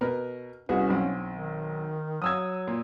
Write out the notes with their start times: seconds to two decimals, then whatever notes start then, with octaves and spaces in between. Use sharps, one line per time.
0.01 B2 A#4 B4
0.69 C2 B3 C#4 F#4 G#4
0.90 B1 C4
1.32 D#3
2.22 F#3 D#6 E6 G#6
2.68 A#2